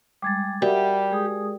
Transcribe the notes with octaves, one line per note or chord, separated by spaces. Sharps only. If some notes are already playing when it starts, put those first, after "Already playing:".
G3 G#3 D6 G#6 A6
G3 F#4 G4 A#4 D5 E5 F#5
G#3 G#4 D#6